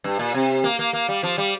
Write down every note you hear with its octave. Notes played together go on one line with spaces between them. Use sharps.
G2
A#2
C3
A#3
A#3
A#3
G3
F3
G3